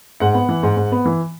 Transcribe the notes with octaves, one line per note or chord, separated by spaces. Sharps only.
G#2 F#5
B3
E3
G#2
G#2
B3
E3